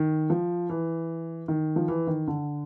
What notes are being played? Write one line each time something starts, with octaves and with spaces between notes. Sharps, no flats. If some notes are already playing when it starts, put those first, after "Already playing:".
Already playing: D#3
F3
E3
D#3
F3
E3
D#3
D3